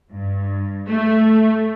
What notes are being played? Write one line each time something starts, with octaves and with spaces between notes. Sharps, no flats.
G2
A3